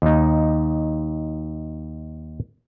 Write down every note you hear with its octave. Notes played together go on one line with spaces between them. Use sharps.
D#2 D#4